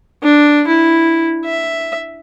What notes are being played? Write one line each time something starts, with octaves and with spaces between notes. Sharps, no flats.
D4
E4
E5